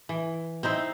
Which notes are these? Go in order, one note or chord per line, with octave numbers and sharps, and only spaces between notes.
E3
C4 D#4 E4 C5